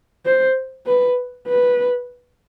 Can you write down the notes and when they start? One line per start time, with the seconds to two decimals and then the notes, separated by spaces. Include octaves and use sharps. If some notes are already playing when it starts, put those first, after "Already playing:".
0.25 C5
0.86 B4
1.48 B4